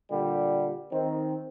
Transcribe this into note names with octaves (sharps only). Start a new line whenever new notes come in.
A#2 D3 G3
D#3 C4